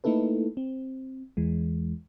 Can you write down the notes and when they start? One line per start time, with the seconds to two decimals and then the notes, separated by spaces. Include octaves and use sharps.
0.04 A3 A#3 D#4 E4 A4 B4
0.57 C4
1.37 E2 E3 G#3